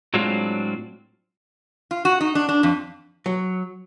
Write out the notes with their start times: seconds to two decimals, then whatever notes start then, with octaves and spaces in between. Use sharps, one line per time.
0.14 A2 F#3 G#3 C4 D4 F4
1.91 F4
2.05 F#4
2.21 D#4
2.35 D4
2.49 D4
2.63 F2
3.26 F#3